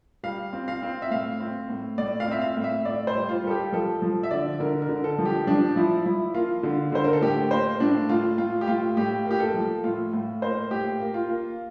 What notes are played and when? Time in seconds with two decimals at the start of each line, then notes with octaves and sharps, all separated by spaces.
0.23 G3 F5
0.53 C4
0.68 F5
0.83 C4
1.02 E5
1.11 A2 F5
1.40 C4
1.69 A2
1.98 A2 D5
2.20 F5
2.28 C4 E5
2.42 F5
2.57 A2
2.64 E5
2.85 A2 D5
3.07 C5
3.15 G3
3.29 F4
3.44 G3 A4
3.51 G4
3.72 F3 A4
4.02 F3
4.23 E5
4.31 D3 D5
4.60 D3 A#4
4.82 A#4
4.89 D3
5.04 A4
5.18 F3
5.25 G4
5.47 F3 D4
5.76 F3 E4
6.05 F3 E4
6.34 A#3 F4
6.63 D3
6.92 D3 C5
7.04 A#4
7.13 A4
7.21 A2 G4
7.51 A#3 C5
7.80 A2 D4
8.09 A2 F4
8.38 A2 F4
8.61 G4
8.68 A2 F4
8.97 A2 G4
9.26 A#3 G4
9.40 A4
9.54 F3
9.84 A2 F4
10.13 A2
10.42 A#3 C5
10.71 A2 G4
11.00 A#3
11.14 F4
11.29 A#3